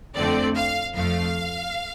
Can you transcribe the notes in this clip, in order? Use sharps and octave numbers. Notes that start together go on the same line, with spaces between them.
F2 D3 A3 C4 D5
F5
F2 F3 A3 F5